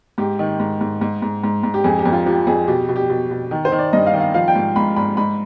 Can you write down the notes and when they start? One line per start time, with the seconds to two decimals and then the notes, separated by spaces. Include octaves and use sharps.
0.18 G#2 G4
0.39 D#3
0.60 G#2
0.81 G#2
1.01 G#2
1.22 G#2
1.43 G#2
1.63 G#2
1.74 G4
1.84 F2 G#4
1.99 G4
2.05 F2
2.12 F4
2.26 F3 G4
2.47 F2 G#4
2.68 B2 G4
2.89 B2
2.96 G4
3.10 B2
3.31 B2
3.51 D#3
3.65 C5
3.72 D#3
3.79 D5
3.93 G2 D#5
4.07 F5
4.14 D#3
4.20 F5
4.34 F3 F5
4.48 G5
4.55 G#2
4.76 G#2 B5
4.96 G#2 B5
5.17 G#2 B5